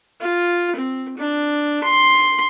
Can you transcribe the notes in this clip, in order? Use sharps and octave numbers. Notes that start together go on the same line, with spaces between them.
F4
C4
D4
C6